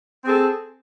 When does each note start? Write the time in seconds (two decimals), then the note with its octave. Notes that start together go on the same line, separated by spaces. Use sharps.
0.22 C4
0.26 G#4
0.30 A4